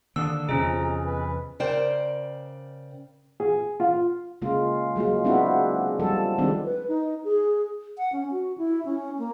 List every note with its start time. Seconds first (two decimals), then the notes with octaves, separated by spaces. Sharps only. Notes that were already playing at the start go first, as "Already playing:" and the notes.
0.16 D3 D#3 A#3 D4 D#6 E6
0.49 B1 E2 C3 F3 C#4 G#4 A#5
1.05 B4
1.60 C#3 A#4 C5 D5 G5
3.40 G#4
3.80 F4
4.42 C#3 G#3 A#3 F4
4.96 F#3 G#3 A#3 F4
5.25 G#3 B3 C4 D4 E4 F#4
5.99 F3 G3 A4
6.38 D#3 F3 G3 G#3 C4 D4
6.65 B4
6.88 D#4
7.24 G#4
7.98 F#5
8.13 C#4
8.31 F#4
8.58 E4
8.85 C#4
9.19 A#3